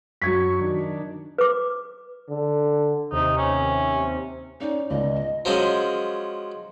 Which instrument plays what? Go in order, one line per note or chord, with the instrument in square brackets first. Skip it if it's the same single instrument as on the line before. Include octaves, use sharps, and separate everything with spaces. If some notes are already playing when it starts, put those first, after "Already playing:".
[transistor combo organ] F#2 C#6 [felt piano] F#3 G#6 B6
[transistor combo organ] D#3 D4
[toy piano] B4 D6
[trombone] D3
[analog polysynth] D#2 C3 [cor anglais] D#4
[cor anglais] C#4
[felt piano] C#4 D5 [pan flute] D#4
[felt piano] C#2 D5 [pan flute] D#5
[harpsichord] F3 F#3 G#3 C#4